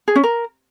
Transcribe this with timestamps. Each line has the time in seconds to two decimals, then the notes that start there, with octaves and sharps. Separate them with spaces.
0.08 G#4
0.16 C#4
0.23 A#4